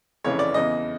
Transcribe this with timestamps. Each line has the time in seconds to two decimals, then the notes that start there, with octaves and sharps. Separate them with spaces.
0.24 F1 F2 C#3 E3 C#5
0.39 D5
0.54 E2 C#3 E3 D#5